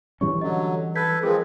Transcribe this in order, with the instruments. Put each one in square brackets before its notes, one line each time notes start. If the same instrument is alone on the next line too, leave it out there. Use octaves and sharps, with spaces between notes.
[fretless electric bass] E3 G3 C#4 [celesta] C#6
[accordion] D3 F#3 [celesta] D#5
[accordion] A4 B4 [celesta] G6 G#6 B6
[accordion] F3 G#3 C4 [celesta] G#4 A#4